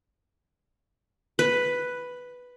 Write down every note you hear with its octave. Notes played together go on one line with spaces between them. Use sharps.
B4